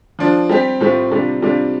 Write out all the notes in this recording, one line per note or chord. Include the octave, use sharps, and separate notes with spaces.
F3 D4 F4
G3 C4 G4
A2 G3 C4 F4
C3 G3 D4 F4
C3 G3 D4 F4